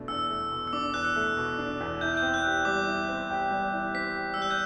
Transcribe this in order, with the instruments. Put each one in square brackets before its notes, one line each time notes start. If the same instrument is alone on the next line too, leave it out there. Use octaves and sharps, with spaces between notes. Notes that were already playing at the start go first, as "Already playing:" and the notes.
Already playing: [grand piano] B2 A3 D4
[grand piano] E2 [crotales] E6
[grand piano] A3
B2
[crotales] E6
[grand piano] D4 [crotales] D6
[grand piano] E2 [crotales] F#6
[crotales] E6
[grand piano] A3
B2
D4
E2
[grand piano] E4 [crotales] G6
[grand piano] C4 [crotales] G6
[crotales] F#6
[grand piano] G4
[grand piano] G3 [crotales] D6
[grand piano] E4
C4
G4
G3
E4
[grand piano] C4 [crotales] B6
[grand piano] G4
[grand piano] G3 [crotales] E6
[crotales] F#6
G6